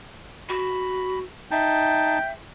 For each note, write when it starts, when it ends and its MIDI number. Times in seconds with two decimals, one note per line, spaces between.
0.49 1.22 66
0.49 1.19 83
1.51 2.18 63
1.51 2.33 76
1.51 2.29 79
1.51 2.18 81